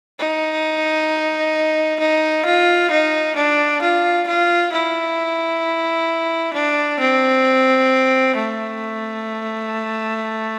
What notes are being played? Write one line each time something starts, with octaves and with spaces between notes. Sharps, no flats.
D#4
D#4
F4
D#4
D4
F4
F4
E4
D4
C4
A3